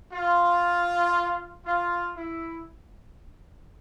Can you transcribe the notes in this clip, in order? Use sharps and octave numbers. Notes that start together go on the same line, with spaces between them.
F4
F4
E4